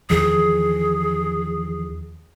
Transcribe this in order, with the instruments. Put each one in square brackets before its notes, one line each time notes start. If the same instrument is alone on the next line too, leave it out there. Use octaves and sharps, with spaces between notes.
[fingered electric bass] E2 D#3 F3 [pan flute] G#4